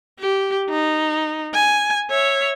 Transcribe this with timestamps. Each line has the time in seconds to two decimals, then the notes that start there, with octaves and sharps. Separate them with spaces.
0.19 G4
0.69 D#4
1.54 G#5
2.10 C#5 E5